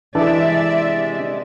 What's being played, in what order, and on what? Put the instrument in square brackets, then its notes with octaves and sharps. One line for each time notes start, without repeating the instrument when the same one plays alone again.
[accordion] C3 G#3 [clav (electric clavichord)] E3 D4 A4 [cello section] D5 E5